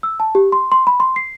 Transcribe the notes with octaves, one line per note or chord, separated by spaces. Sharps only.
E6
A5
G4
C6
C6
B5
C6
C7